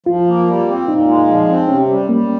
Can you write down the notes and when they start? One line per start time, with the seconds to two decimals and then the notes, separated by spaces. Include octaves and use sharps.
0.06 F3 F4
0.28 A#3
0.47 G3
0.68 C4
0.88 A#2 D#4
1.07 G#3
1.27 F3
1.48 C4
1.68 C3 C#4
1.88 G3
2.09 G3 A#3